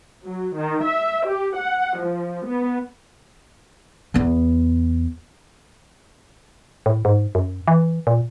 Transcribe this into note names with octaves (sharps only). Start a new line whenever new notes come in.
F#3
D#3
E5
G4
F#5
F3
B3
E2 B3
A2
G#2
F#2
E3
A#2